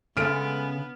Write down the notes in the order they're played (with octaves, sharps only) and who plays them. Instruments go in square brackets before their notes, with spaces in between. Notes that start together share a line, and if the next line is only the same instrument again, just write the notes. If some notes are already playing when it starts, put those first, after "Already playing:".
[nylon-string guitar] C#3 [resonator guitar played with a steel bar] G#3 A4 E5 [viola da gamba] B3 [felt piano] F6 D7